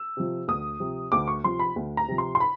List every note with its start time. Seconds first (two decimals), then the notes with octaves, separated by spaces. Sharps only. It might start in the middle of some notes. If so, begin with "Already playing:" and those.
Already playing: E6
0.17 C3 F3
0.48 D2 D#6
0.80 C3 F3
1.12 D2 D6
1.28 C#6
1.44 C3 F3 C6
1.59 B5
1.76 D2
1.97 A#5
2.08 C3 F3
2.18 C6
2.35 C6
2.40 B5